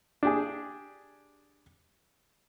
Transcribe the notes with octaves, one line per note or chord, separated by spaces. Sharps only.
D4 G4 G#4